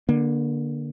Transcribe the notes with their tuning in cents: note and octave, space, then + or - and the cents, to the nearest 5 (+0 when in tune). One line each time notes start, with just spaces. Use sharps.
D3 +0 A#3 +25